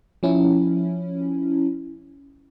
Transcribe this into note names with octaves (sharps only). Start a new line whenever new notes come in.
F3 C#4 E4